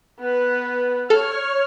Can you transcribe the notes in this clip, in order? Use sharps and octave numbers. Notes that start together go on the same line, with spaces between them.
B3 B4
A4 C#5 F6